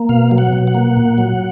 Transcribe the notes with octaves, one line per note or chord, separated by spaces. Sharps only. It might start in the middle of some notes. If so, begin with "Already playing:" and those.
Already playing: A#3
B2 F5
F#3
F#5
B2
F#5
A#3
A#2
F#3